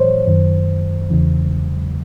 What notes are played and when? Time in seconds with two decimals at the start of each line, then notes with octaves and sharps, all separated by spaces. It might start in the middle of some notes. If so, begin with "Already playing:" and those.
Already playing: A2 E3 C5 C#5
0.27 F#2 D#3
1.10 E2 C#3 E3